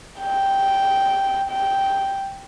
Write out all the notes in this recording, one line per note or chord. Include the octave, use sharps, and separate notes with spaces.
G5
G5